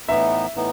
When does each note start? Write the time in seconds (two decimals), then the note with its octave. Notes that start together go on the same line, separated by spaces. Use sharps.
0.08 A2 E3 B3 D#4 E5
0.56 A2 E3 B3 D#4